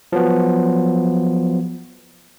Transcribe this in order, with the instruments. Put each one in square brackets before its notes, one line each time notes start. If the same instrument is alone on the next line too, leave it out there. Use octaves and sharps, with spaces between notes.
[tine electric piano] F3 F#3 B3